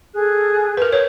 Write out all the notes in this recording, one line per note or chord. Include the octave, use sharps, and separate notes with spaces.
G#4 A4 F#6
A#4 B4
B4 C#5